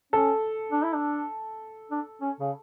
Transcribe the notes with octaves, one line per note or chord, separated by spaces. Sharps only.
C#4 A4
D4
E4
D4
D4
C#4
C#3